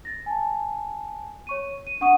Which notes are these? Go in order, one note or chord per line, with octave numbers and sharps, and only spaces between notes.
A6 A#6
G#5 A5
C#5 C#6 D#7
D#7
D4 F#5 C#6 D#6 D#7